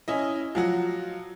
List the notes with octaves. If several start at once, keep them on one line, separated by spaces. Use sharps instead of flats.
C#4 E4 D#5
F3 F#3 F#4